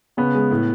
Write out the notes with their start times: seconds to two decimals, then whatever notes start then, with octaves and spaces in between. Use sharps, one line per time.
0.17 C#3 B3
0.35 G#3
0.51 A2